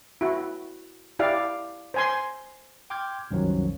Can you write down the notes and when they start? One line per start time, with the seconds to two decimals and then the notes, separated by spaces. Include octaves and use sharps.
0.21 E4 F#4
1.19 E4 G4 D5 F5
1.94 C5 G#5 C6
2.90 G5 C6 D6 F6 G6 G#6
3.31 C2 F#2 D#3 F3 F#3